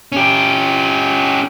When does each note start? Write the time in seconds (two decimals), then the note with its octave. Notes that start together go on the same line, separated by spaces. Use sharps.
0.12 C#4 G4